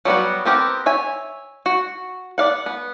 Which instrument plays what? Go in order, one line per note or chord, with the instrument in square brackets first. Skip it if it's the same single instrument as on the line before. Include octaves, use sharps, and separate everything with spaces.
[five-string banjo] F#3 G3 B3 F#4
B3 C4 G4 A#4
C#5 E5 G#5
F#4
B3 D5 F5 F#5
B3